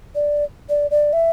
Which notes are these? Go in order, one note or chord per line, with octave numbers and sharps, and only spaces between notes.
D5
D5
D5
E5